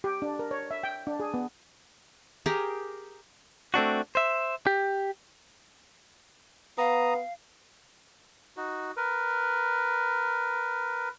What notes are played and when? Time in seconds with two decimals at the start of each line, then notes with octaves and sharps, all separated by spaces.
0.04 G4
0.22 D4
0.39 A#4
0.51 C#5
0.71 E5
0.83 G5
1.07 D4
1.20 G#4
1.34 B3
2.46 G4 G#4 A#4
3.74 A3 C4 D4 F#4
4.15 C5 E5
4.67 G4
6.78 B3 F5 A#5 D#6
8.57 D#4 F#4
8.97 A#4 B4